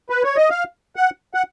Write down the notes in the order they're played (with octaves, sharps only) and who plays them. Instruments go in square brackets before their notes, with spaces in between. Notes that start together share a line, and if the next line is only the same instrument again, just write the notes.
[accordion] B4
C#5
D#5
F5
F#5
F#5